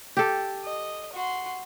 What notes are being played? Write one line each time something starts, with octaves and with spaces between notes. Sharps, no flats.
G4 A4
D#5
F#4 C6